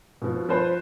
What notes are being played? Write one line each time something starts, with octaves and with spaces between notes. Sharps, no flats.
B2 F3
F3 B4 C5